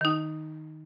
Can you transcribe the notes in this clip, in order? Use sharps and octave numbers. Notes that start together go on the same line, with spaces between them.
D#3 D#4